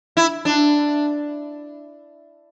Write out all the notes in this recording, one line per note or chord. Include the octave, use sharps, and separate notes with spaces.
E4
D4